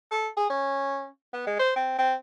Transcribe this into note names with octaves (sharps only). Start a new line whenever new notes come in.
A4
G#4
C#4
B3
G#3
C5
C4
C4